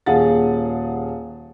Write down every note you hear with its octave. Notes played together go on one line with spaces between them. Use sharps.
D#1 G#4 F5 F#5 A6